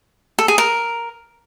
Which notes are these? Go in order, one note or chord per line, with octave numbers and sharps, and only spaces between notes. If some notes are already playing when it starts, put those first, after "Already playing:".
A4
G#4
A#4